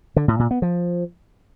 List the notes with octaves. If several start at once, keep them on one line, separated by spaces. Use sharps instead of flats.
D3
A2
A#2
B3
F3